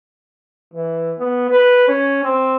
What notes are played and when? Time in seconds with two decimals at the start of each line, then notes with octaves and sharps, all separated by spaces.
0.74 E3
1.18 B3
1.50 B4
1.88 C#4
2.23 C4